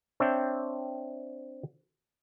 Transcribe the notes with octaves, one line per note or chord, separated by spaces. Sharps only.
C4 D4 C#5 E5 G5